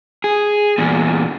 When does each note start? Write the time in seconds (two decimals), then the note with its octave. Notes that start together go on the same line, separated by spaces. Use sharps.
0.24 G#4
0.78 E2 A#2